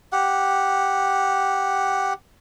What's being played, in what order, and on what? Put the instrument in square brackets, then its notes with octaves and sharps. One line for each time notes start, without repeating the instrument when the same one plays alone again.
[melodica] G4 F#5